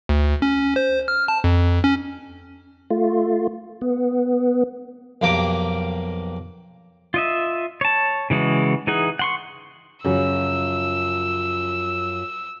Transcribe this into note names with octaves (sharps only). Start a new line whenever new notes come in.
D2
C#4
C5
F6
A5
F2
C#4
A3 F4
B3
B1 F2 A#3 G4 A#4 D6
F4 D#5 E5
C#5 A5
C#3 E3 G#3 F#4
E3 D#4 G#4 F#5
F#5 C6 C#6
F#2 C#3 F3 F#3 E6